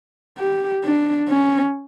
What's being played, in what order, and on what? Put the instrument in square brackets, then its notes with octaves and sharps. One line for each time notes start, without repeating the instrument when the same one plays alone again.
[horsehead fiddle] G4
D4
C#4